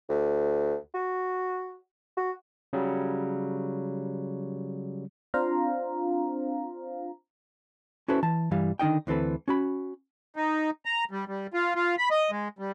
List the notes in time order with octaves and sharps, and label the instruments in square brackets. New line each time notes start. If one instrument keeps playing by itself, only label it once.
[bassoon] D2
F#4
F#4
[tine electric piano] C#3 F#3 G3
[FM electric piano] C4 D4 F4 C5 F5 A#5
[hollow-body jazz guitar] C#4 E4 F#4 A4 B4 C5
E3 A5
C2 G2 E3 G3 F5
D3 D#3 D#4 D#5 G5
D2 E3 C4 A4 B4
C#4 F#4 B5
[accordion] D#4
A#5
G3
G3
F4
F4
B5
D#5
G#3
G3